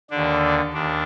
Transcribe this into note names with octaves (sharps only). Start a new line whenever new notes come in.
D#2 D3 D4
D#2 D4